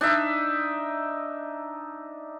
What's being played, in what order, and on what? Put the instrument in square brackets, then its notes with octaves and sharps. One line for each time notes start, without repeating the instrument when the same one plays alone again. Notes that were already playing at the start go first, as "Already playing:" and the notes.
[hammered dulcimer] D4 D#4 E5